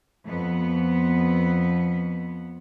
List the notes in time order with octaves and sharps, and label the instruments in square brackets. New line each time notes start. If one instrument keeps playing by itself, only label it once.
[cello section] F2 B3